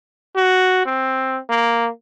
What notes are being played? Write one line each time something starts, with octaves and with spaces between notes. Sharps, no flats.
F#4
C4
A#3